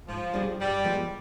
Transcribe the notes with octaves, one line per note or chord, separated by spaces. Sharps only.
G#2 F3
G3 D4 G#4 D5
G2 G3
F3 G#3 B3